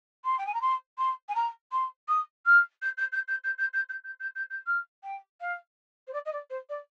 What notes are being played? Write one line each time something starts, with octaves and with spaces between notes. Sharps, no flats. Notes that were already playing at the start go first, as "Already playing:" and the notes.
C6
G5
G#5
A#5
C6
C6
G#5
A#5
C6
D#6
F6
G6
G6
G6
G6
G6
G6
G6
G6
G6
G6
G6
G6
F6
G5
F5
C5
D5
D#5
D5
C5
D5